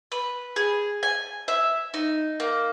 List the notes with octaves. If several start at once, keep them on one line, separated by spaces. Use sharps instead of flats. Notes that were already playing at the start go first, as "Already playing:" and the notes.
B4
G#4
G#5
E5
D#4
A#3